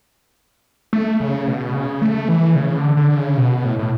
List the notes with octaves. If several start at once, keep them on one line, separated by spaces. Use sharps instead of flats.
A3
C#3
B2
C#3
A3
E3
C#3
D3
D3
C#3
B2
A2
A2